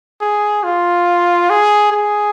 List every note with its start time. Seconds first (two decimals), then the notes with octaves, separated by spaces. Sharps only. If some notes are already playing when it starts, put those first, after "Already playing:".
0.21 G#4
0.63 F4
1.50 G#4
1.92 G#4